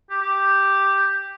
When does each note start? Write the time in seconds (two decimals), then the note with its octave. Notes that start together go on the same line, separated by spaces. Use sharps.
0.10 G4
0.22 G4